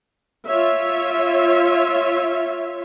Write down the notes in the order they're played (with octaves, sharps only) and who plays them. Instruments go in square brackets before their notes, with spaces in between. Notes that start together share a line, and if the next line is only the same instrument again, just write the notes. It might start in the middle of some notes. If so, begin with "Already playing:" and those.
[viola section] F4 C#5 E5